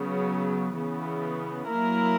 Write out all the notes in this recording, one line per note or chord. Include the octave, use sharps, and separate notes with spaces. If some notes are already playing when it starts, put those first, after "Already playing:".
Already playing: C#3 F#3 B3
C#3 E3 B3
F#3 A#3 E4 A#4